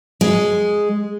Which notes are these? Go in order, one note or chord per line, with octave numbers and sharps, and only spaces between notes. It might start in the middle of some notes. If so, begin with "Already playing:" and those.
G#3